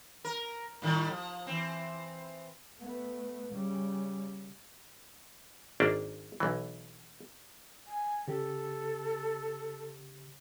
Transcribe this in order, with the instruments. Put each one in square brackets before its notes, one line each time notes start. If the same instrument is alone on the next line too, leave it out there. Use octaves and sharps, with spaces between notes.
[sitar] A#4
A2 D#3 G3
F3
E3 C4
[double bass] A3 B3
C#3 G3
[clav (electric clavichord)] G#1 A#3 D4
B1 E3
[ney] G#5
[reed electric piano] C#3 G4 [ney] A4